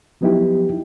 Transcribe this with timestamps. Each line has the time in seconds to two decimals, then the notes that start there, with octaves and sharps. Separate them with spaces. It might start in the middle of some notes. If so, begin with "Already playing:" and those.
0.21 F3 F#3 B3 D#4 E4 G4